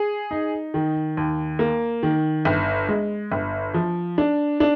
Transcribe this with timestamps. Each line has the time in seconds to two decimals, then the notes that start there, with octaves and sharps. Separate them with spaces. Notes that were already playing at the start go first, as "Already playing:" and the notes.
Already playing: G#4
0.31 D#4
0.74 D#3
1.17 D#2
1.59 A#3
2.03 D#3
2.45 G1
2.89 G#3
3.32 G1
3.74 F3
4.18 D4
4.60 D4